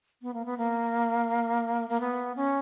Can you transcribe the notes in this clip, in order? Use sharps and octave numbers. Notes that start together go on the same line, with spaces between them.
B3
A#3
B3
A#3
A#3
B3
C#4